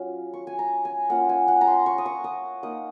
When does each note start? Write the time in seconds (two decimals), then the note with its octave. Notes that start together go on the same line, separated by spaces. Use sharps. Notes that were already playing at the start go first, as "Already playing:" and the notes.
Already playing: F#3 C#4 F4
0.33 C#6
0.47 G#5
0.59 A#5
0.85 G#5
1.09 A#3 C#4 F4 F#5
1.29 G#5
1.48 F#5
1.61 A#5
1.67 C6
1.86 C#6
1.98 D#6
2.06 C#6
2.24 D#6
2.63 A#3 D#4 D#6